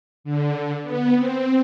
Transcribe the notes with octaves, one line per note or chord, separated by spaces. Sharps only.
D3
B3
C4